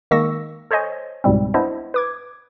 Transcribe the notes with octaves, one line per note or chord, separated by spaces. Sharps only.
D#3 G#3 A#3 C#6 E6 A#6
A4 C5 C#5 D#5 G#5
C#2 G#2 B2 G3 C4
B3 D4 E4 C5 D#5
B4 D6 G#6